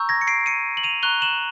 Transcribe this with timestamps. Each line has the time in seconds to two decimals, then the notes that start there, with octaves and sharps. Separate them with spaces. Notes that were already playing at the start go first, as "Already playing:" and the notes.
Already playing: A#5 C#6 E6 G6
0.09 G#6 A#6
0.21 C#7
0.27 C7 D7
0.46 C#7 D#7
0.77 F#7
0.83 D#7 F7
1.03 A#5 C#6 F#6 F7 G7
1.22 E7 F#7